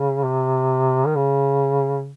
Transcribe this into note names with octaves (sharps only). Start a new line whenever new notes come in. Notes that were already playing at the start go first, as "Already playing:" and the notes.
Already playing: C#3
C3
D#3
C#3